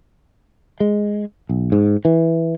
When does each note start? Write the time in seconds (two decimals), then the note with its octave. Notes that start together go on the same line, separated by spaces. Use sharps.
0.80 G#3
1.49 B1
1.72 G#2
2.05 E3